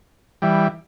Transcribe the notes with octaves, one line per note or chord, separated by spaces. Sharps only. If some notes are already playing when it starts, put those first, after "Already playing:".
E3 G3